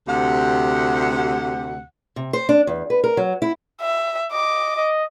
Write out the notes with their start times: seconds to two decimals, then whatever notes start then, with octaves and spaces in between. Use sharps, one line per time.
0.07 D2 C3 G4 F#5
2.16 C3
2.33 C5
2.49 D4
2.67 E2
2.90 B4
3.04 A#4
3.17 F#3
3.42 E4
3.81 E5
4.32 D#5 D6
4.76 D#5